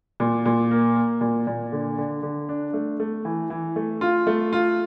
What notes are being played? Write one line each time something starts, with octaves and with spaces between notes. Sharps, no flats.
A#2
A#2
A#3
A#3
A#2
A#2
D3
D3
D3
D4
A3
A3
E3
E3
A3
F4
A3
F4